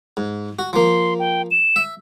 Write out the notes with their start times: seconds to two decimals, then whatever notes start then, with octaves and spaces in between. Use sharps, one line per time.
0.17 G#2
0.59 F#4
0.73 F3 A#3 C6
1.19 G5
1.51 E7
1.76 E5